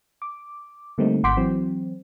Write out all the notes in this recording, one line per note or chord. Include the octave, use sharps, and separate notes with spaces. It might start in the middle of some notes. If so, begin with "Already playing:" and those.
D6
D3 G3 A3 A#3 C4 D#4
G#1 F#5 C6 D6 G6 B6
E3 F#3 C4